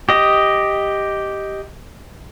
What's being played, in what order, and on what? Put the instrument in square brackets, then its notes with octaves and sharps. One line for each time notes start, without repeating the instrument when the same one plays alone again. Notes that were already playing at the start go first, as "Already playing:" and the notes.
[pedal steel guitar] G4 D#5